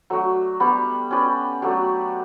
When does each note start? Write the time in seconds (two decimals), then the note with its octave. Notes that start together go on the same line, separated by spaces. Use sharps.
0.10 F#3 A3 D4 F#4
0.60 G3 B3 D4 G4
1.11 C#4 G4 B4 D5
1.62 F#3 A3 D4 G4